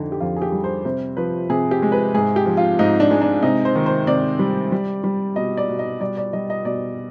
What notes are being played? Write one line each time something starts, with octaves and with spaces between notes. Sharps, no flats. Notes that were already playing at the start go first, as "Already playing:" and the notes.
Already playing: F2 D3 D#4
G4
F2 F4
G#4
G4
G3
C5
C3 C5
F3 B4
C3 G#4
G4
G#3
B4
G#2 G#4
G4
F3
F4
G#2 D#4
D4
G#3
D4
C3 D#4
C5
D#3
C5
C3 D5
G3
G3
G3
B2 D#5
D5
B2
D#5
G3 D5
D5
G3 D#5
D#5
B2 D5